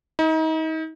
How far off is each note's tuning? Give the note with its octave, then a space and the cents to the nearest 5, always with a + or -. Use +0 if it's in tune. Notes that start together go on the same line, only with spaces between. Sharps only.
D#4 +35